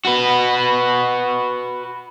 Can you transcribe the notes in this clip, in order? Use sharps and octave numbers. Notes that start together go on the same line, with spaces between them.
F#4 B4